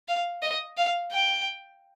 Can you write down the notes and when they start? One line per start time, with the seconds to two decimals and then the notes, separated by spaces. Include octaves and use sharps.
0.08 F5
0.42 D#5
0.77 F5
1.12 G5